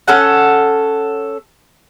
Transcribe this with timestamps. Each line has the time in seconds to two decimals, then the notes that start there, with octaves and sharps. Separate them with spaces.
0.08 C#4 A4 F#5